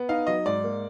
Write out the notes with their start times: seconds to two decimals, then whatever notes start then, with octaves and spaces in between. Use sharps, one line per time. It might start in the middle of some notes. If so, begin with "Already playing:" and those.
Already playing: B3
0.09 D#4 F5
0.27 F#3 D#5
0.46 G#2 D5
0.64 A#3